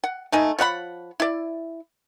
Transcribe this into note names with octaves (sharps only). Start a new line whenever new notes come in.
F#5
A3 D#4 G#5
F3 C#5 F#5 B5
E4 D5